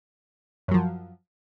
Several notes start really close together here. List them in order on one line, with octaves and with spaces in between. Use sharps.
F#2 F#3 F3